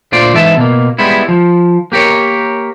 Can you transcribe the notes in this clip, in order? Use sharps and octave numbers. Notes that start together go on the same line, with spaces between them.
D2 A#2 F4 C5 D5
G#2 E3 E5 A5
B2 A#3
G3 G#3 B3 E4
F3
A#3 G4 A#4 C#5